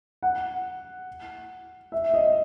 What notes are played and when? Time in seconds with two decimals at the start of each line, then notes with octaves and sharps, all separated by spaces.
0.23 F#5
1.92 E5
2.14 D#5